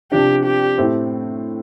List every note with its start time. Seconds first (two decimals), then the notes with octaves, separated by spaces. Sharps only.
0.12 C3 F3 D4 G4
0.45 G4
0.78 A2 A3 C4